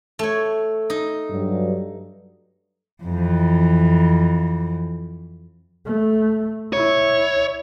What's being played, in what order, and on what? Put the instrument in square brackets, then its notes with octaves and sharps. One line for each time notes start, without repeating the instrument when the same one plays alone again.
[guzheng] A3 C#5
D#4
[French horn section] G2 F#3
[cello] F2 E3
[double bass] A3
[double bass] E4 [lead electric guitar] C#5